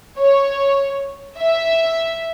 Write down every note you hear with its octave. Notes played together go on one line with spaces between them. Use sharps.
C#5
E5